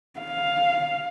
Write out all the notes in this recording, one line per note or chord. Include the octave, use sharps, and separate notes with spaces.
F5